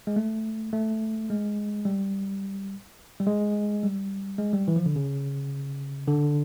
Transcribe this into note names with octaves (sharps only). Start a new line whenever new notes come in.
G#3
A3
A3
G#3
G3
G3
G#3
G3
G#3
G3
E3
F3
D3
C#3
D3